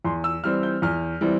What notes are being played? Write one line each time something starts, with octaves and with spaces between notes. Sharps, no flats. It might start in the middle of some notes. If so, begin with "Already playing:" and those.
E2 C6
E6
E3 G3 C4 F6
G6
E2 F6
E3 G3 C4